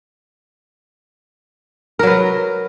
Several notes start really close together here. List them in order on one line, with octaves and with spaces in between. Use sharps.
A#4 F#3 B4